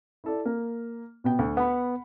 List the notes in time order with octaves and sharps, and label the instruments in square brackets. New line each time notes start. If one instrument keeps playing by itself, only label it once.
[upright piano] E4 A4 D5
A#3
B2 B3 G5
D2
[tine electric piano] B3 [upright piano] F#5 B5